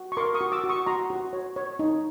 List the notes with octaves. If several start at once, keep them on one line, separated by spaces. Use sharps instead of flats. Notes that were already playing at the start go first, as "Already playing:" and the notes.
Already playing: F#4
C#6
A#4 C6 D6
C#6 D#6
F#4
D6 E6
F#4
C#6 D#6
F#4 A#5 C6
F#4
C#5
C#5
D#4